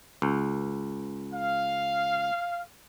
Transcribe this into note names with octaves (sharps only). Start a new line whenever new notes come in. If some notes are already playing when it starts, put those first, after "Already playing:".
C#2
F5